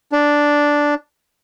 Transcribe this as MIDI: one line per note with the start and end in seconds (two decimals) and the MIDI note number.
0.12 0.94 62